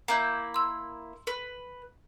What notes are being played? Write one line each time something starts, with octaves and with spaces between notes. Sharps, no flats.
A#3 E4 A#5 G6
C6 E6
B4